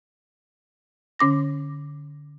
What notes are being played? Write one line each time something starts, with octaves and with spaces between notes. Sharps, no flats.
D3 C#4 D6 A#6